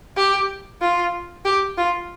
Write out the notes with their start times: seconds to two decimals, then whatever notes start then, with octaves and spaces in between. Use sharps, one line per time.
0.17 G4
0.81 F4
1.45 G4
1.77 F4